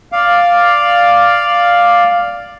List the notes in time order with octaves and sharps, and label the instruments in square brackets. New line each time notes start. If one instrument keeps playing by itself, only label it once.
[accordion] D5 F5